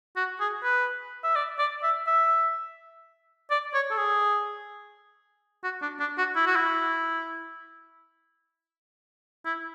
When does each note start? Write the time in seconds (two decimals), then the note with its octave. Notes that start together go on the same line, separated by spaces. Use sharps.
0.16 F#4
0.40 G#4
0.64 B4
1.24 E5
1.36 D5
1.59 D5
1.83 E5
2.07 E5
3.51 D5
3.74 C#5
3.91 A4
3.98 G#4
5.64 F#4
5.82 D4
6.00 D4
6.18 F#4
6.36 E4
6.47 F#4
6.56 E4
9.46 E4